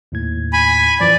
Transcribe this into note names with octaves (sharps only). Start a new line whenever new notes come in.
D#2 A2 G#6
G#5 B5
F#2 E3 F3 D5